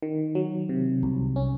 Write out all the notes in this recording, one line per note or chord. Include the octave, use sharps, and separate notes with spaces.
D#3
F#3
C3
C2
C#4